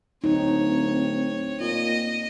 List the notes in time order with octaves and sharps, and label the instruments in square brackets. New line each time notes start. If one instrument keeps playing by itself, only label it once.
[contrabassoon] D1 [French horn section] C4 [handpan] D#4 [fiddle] C#5
[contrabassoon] A#2 [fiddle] D#5